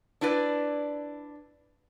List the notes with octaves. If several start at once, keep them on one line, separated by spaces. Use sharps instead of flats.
D4 E4 B4 D5